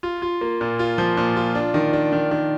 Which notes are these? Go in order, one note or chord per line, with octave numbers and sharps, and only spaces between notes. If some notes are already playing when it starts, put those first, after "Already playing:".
F4
F4
A#3
A#2
F4
F3
A#2
F4
D4
D#3
D4
D#3
D#3